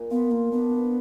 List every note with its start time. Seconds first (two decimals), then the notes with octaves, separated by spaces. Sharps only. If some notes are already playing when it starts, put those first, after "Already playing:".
Already playing: A#2
0.11 B3 F4
0.31 A#3 F4
0.52 B3 D4
0.71 B4